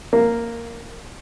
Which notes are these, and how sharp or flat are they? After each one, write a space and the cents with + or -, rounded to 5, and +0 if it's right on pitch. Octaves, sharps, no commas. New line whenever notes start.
A#3 -5